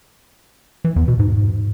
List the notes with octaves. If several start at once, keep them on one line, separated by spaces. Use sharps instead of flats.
E3
E2
B2
G#2